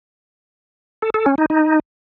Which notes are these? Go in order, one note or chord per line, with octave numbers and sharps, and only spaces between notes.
A4
A4
C#4
D#4
D#4